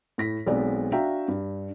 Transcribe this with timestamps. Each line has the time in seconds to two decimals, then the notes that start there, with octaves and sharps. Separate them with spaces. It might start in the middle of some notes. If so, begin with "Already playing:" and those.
0.18 A2 A#6 B6
0.47 B1 G#3 B3 C4 D5
0.92 D4 F#4 E5 F5 G5 A#5
1.28 G2